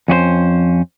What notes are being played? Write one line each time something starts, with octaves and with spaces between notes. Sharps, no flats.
F2 C#4 F#4 C5